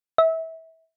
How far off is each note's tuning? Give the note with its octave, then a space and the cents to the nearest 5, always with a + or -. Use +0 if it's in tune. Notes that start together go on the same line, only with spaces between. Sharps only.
E5 -25